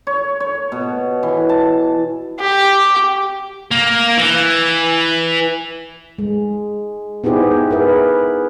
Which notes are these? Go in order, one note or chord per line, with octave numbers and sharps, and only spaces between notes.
C#5
C#5
B2
E3
A5
G4
A#3
E3
G#3
B3 D#4 E4 G4 G#4 C5
G4
G#4 A#4 B4 E5